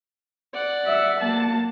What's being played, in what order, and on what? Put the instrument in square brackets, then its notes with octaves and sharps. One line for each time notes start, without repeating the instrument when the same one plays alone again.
[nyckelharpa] D5 F#5
[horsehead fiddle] E5
A#3 A5